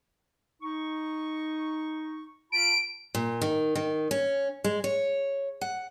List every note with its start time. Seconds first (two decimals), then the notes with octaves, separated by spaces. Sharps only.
0.62 D#4 C#6
2.52 F4 A5 B5 D7
3.15 A#2
3.42 D#3
3.75 D#3
4.11 C#4
4.64 G#3
4.84 C#5
5.61 F#5